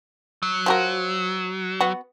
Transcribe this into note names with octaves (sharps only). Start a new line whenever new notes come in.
F#3
F3 F#4 A#4
B3 F#4